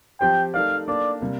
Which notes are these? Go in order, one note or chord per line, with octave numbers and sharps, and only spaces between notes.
F3 C4 G4 C5 G5
A3 D#4 A#4 D5 F5
A#3 D4 A4 D5
C3 G3 A#3